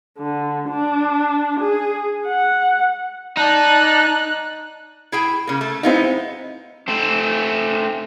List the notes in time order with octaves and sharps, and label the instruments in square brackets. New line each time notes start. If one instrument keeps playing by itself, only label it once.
[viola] D3
D4
G#4
F#5
[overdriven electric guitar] D#4 [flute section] D5 A5 [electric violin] F#6
[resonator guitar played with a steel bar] E4 G#4 G5
C#3 A#3
A3
[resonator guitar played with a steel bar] G#3 B3 D#4 [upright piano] C4 E4 F5
[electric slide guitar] A3 C4